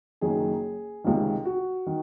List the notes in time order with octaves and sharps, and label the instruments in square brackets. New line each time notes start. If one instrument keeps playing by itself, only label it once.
[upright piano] F#1 F#2 D#3 G#4
C#2 C3 D#3
F#4
D#3